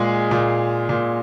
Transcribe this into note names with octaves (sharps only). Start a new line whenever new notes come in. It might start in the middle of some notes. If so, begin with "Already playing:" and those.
Already playing: A#2 G#3 G#4
A#2
A#2